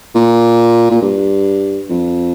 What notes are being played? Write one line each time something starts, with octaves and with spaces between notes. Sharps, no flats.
A#2
A#2
G2
F2